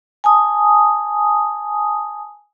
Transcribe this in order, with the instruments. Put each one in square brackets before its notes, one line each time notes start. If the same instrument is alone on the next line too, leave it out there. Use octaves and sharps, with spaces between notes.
[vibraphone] G#5 A5 D#6